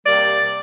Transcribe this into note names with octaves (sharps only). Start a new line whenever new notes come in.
C3 G3 A#3 D5